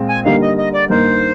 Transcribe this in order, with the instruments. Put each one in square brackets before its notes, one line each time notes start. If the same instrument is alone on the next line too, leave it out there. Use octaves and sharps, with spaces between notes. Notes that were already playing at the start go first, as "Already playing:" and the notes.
Already playing: [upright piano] A#2 G#3 C4
[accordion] G#5
[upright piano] D3 G3 A#3 D#4 [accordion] F5
[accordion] D#5
D#5
D5
[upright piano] G2 D#3 A#3 D#4 [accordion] C5